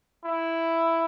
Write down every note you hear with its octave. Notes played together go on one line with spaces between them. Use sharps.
E4